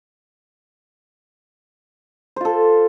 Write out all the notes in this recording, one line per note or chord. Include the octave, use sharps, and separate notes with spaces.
F4 A4 C5